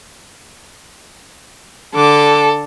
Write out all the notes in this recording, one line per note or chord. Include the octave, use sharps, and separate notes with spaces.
D3 A4 D6